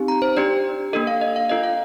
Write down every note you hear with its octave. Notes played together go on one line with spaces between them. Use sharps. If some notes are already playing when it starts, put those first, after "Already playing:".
Already playing: C4 D#4 G4
A#5
C5
D4 G4 D5
A#3 D4 A4 D#5
F5
D#5
F5
D4 F4 A4 D#5
F5